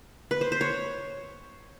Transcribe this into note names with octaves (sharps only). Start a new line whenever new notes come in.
B4
C5
C5
C#5